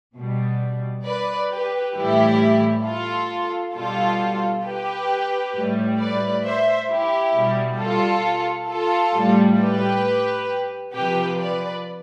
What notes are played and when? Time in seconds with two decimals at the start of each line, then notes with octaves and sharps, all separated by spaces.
0.16 B2 G3
1.06 B4 D5
1.51 G4 B4
1.96 A2 E3 G3 E4 G4
2.85 F4 A4
3.75 B2 G3 F4 A4
4.65 G4 B4
5.55 A2 G3
6.00 B4 D5
6.44 C5 E5
6.90 E4 G4
7.35 B2 G3
7.79 F4 A4
8.68 F4 A4
9.14 A2 G3
9.58 G4 B4
10.93 C3 F3 G4 B4
11.38 B4 D5